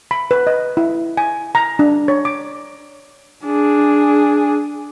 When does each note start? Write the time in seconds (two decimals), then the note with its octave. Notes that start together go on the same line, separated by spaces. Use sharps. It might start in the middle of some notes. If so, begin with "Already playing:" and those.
0.11 B5
0.31 B4
0.47 D#5
0.77 E4
1.17 G#5
1.55 A#5
1.79 D4
2.08 C#5
2.25 D6
3.45 D4 G#4